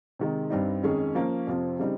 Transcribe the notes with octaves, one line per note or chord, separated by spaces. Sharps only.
C3 D#3 G#3
G2 G3 C4 D#4
F2 D#3 G#3 C#4 G#4
F3 A#3 C#4
F2 C3 F3 C4
C#3 G3 C4 D#4